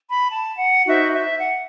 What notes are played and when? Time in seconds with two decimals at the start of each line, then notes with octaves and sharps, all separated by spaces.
0.10 B5
0.30 A5
0.57 F#5
0.84 D#4 F#4 C5 E5
1.12 E5
1.40 F#5